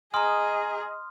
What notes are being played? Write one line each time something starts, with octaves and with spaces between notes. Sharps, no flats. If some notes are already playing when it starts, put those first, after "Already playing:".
G#4 D#5 G#5 A#5 C6 D#6 F6